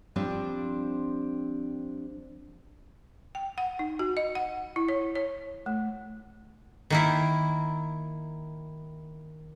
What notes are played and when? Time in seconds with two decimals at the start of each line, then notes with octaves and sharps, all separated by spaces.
0.16 F3 G3 C4 D4
3.35 G5
3.58 F#5
3.79 D#4
3.99 F#4
4.17 D#5
4.35 F#5
4.76 E4
4.89 C#5
5.15 C#5
5.66 A3
6.90 D#3 A#3 E4